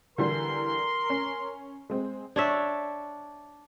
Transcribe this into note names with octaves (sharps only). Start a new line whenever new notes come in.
D3 E3 G3 A#4 C6
C#4
G#3 C4
D4 C#5 E5